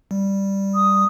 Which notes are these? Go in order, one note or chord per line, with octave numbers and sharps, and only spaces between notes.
G3
D#6